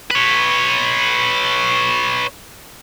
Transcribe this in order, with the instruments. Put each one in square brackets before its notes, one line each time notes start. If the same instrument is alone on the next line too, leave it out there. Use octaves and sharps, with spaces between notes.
[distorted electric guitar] B4 C#5